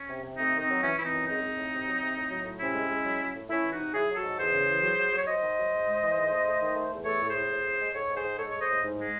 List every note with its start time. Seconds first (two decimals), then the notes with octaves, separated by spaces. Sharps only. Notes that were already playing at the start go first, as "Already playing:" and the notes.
Already playing: C#4
0.09 C3
0.24 C3
0.37 A3 C4 D#4
0.53 D#3
0.60 C4 D#4
0.68 F#3
0.83 E3 C#4
0.98 E3 E4
1.05 C4 D#4
1.12 F#2
1.27 G#3 C4 D#4
1.42 G#3
1.57 A2
1.72 C3
1.87 F#3
2.01 C3
2.16 A2
2.31 F#3
2.45 A2
2.60 C3 C#4 E4
2.75 G#3
2.90 G#3
3.05 F#3
3.20 F#3
3.35 A2
3.49 A3 C#4 E4
3.65 E3
3.72 D#4 F#4
3.79 C3
3.94 F#3 E4 G#4
4.10 F#3
4.16 F#4 A4
4.24 G#2
4.38 E2 G#4 C5
4.54 C#3
4.68 E3
4.84 F#3
4.98 F#3
5.13 F#3
5.18 C#5
5.27 F#3 C5 D#5
5.42 D#3
5.58 F#3
5.72 G#2
5.87 G#3
6.02 E3
6.17 G#2
6.32 A3
6.47 A3
6.61 D#3
6.76 A3
6.91 E2
7.05 A3 A4 C#5
7.21 A2
7.27 G#4 C5
7.35 A2
7.50 A2
7.65 A2
7.80 G#3
7.94 G#2 A4 C#5
8.09 G#2
8.17 G#4 C5
8.24 G#2
8.39 G#3 A4 C#5
8.50 G#3 C#5
8.61 C5 D#5
8.70 A2
8.84 G#2
8.99 G#3